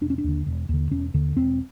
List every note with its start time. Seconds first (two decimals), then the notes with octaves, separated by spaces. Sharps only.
0.01 E1 D4
0.10 C#4
0.18 D4
0.24 D#2 D3
0.46 E1
0.69 D#2 D3
0.91 E1 C#4
1.14 D#2 D3
1.36 E1 C4